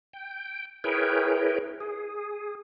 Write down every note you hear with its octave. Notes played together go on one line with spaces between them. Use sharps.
G5
E4 G#4 A#4 B4 C#5 G5
G#4